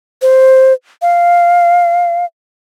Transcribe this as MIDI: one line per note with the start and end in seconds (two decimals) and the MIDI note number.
0.22 0.73 72
1.02 2.25 77